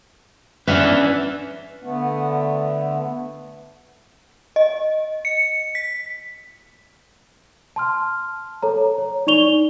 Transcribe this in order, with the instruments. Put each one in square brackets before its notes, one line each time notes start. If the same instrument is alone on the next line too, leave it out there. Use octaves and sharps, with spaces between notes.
[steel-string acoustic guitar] C#4 D4 [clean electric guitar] B4 E5 F#5
[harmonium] D3 A3 B3
[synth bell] D#5
C#7
B6
[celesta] A5 C6 F6
A4 C#5 A#5
C#5
D#4 D5 C#6 F7 G7